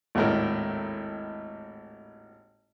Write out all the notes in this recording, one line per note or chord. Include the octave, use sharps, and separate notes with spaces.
G#1 D#2 A2 A#4